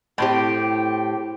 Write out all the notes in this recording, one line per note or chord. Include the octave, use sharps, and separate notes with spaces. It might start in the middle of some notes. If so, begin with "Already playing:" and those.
A2 C4 G4